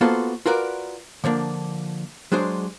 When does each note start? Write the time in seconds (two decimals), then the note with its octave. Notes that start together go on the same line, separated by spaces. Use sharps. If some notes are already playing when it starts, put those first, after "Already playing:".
0.01 A#3 B3 F4 F#4 A4 C5
0.46 F4 F#4 A#4 B4 D5
1.24 D3 F3 A#3 D4
2.32 F#3 G#3 D4 G#4 C5